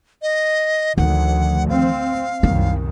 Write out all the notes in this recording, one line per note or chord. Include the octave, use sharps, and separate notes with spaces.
D#5
D2 D#3 F3 F#5
C4 F5
C2 F#2 D#3 C4